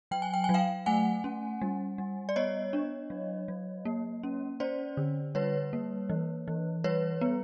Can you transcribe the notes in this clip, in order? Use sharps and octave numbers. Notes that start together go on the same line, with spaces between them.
F#3 G5
G#5
G5
F#3 G#5
F5 G5
A3 F#5 G#5
C#4
G3
G3
D5
B3 C#5 D#5
D4
F#3
F#3
A#3
C#4
C#4 C5 D5
D3
G3 B4 C#5
A#3
E3
E3
G3 B4 C#5
B3